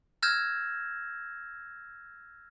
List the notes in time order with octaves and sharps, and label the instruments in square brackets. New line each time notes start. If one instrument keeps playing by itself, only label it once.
[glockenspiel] E6 F6 G6 G#6 A#6 E7